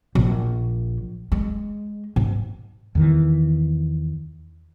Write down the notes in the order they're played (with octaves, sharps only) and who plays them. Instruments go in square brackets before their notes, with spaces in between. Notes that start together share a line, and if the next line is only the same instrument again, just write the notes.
[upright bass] A#1
G#3
G#2
[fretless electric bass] E2 D#3 E3